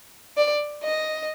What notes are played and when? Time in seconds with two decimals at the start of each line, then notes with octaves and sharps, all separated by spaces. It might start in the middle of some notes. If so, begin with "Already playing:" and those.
0.37 D5
0.84 D#5